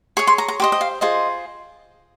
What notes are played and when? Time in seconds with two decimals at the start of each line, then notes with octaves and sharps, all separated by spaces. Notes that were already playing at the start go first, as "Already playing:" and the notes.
0.17 G#4 C#5 C#6
0.27 C6
0.38 A#5
0.49 A#5
0.60 G4 C5 D#5
0.72 D#5
0.81 F5
1.01 F4 G#4 C5 D#5